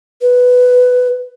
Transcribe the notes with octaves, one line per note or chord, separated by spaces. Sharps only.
B4